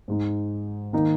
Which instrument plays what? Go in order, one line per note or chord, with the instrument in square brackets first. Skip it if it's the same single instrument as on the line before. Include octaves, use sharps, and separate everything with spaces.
[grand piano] G#2 G#3 D#4
D#3 A#3 D#4